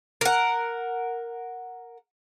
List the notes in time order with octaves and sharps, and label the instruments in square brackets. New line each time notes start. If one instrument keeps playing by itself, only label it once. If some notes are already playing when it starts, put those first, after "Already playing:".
[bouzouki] A#4 F#5